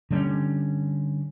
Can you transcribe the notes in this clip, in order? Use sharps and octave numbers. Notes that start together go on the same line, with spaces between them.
D3 G3 A#3 C#4